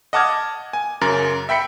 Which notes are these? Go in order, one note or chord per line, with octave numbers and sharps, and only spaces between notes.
D#5 F#5 A5 D6 F6 G#6
G#5
F#2 C#3 A#4 A6
E5 G5 B5 B6 C#7